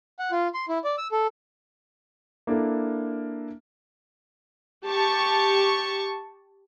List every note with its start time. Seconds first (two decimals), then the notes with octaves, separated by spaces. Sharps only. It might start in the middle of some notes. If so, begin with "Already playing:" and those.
0.19 F#5
0.31 F4
0.54 C6
0.69 E4
0.84 D5
0.98 E6
1.12 A4
2.47 A#3 D4 E4 A4 A#4
4.86 G4 A5 C#6